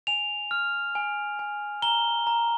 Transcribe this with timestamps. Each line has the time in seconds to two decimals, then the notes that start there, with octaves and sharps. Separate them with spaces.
0.07 G#5 F7
0.51 F6
0.95 G#5
1.39 G#5
1.82 A#5 G7
2.27 A#5